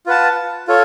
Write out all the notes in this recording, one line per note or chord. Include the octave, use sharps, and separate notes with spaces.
F4 B4 F#5 A5
F4 A4 C#5